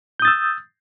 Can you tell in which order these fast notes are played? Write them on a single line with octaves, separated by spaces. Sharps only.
G6 D#6 A6 E6